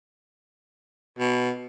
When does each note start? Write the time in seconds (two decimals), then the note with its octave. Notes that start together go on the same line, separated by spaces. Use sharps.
1.19 B2